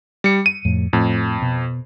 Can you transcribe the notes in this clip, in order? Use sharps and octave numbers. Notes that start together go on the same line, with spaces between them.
G3 C#7
D#7
F2 A2
F2 A2
B2